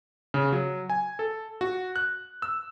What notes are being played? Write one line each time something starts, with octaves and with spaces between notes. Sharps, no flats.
C#3
F#3
G#5
A4
F#4
F#6
E6